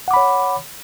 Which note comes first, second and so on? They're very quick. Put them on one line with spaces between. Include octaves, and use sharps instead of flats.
F#5 D6 B5 C#5